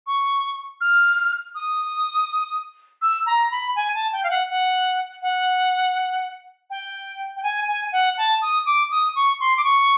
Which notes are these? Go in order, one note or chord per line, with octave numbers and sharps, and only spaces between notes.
C#6
F6
D#6
E6
A#5
B5
G#5
A5
G5
F5
F#5
F#5
F#5
G5
G5
G#5
G#5
F#5
A5
D#6
D6
D#6
C#6
C6
D6
C#6